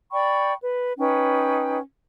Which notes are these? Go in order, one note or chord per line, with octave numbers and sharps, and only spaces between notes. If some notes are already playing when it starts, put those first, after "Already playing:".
D5 G5 B5 C#6
B4
C#4 D#4 B4 G5